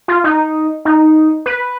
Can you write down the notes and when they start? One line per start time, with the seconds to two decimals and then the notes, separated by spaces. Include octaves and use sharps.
0.08 F4
0.24 D#4
0.85 D#4
1.46 B4